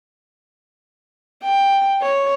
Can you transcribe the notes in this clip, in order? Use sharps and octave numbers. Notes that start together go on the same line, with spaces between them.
G5
C#5